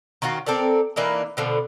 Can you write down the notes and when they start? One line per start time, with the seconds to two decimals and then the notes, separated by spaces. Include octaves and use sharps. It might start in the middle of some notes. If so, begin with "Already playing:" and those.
0.22 D#3 C#4 F4 F#4
0.46 C4 A4 A#4 D5
0.96 E3 A#3 D4 D#4
1.37 B2 D3 F3